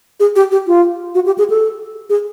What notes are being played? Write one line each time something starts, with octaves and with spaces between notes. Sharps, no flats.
G#4
G4
G4
F4
F#4
G4
G#4
A4
G#4